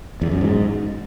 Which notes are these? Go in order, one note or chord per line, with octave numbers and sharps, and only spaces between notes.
E2
F#2
G#2